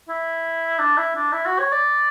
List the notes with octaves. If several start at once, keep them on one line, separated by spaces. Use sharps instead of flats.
E4
D4
E4
D4
E4
F#4
C#5
D5